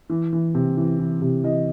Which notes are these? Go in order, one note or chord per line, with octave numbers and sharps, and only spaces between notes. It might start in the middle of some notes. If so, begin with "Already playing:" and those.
E3
E3
C3
E3
E3
C3
E3 D#5